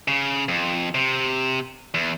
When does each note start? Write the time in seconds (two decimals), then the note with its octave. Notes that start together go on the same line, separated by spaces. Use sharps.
0.08 C#3
0.49 F2
0.95 C3
1.94 E2